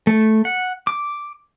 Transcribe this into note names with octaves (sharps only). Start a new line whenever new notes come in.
A3
F#5
D6